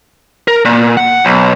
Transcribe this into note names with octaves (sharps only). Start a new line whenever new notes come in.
A#4
A#2
F#5
B1